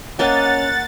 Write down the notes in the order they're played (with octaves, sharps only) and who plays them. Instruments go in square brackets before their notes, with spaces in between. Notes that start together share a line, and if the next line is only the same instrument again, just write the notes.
[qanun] A#3 D#5 [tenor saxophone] C#4 [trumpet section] F#5 [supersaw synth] A6